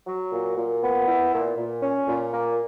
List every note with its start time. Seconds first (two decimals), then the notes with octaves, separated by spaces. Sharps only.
0.07 F#3
0.32 A#2
0.57 A#2
0.82 B3
1.07 E4
1.33 A#2
1.57 A#2
1.82 C#4
2.08 A#2
2.33 A#3